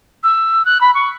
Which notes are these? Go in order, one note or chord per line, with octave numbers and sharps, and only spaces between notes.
E6
F#6
B5
C#6